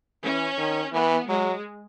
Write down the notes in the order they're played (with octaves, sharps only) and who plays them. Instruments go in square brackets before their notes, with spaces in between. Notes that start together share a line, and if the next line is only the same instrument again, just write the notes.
[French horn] E3 [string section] C#4
[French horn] D#3
[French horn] E3 [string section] B3
[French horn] F#3 [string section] G#3